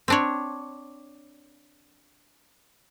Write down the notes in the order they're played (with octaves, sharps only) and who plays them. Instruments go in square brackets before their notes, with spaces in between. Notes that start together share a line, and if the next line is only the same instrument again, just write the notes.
[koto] C4 D4 C#5